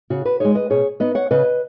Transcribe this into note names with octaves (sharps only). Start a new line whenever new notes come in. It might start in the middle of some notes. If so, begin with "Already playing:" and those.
C#3 F#4
F#4 B4
G#3 D#4 G#4 C#5
B4 D#5
B2 G#4 C#5
B3 D#4 B4 D#5
C#5 F#5
C#3 B4 D#5